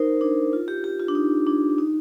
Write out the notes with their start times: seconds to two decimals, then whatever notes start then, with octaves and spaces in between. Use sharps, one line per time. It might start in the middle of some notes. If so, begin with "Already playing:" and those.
Already playing: D#4 A#4 C5
0.21 D4
0.53 F4
0.68 G4
0.84 G4
1.00 F4
1.08 D4
1.15 D#4
1.47 D4
1.78 D#4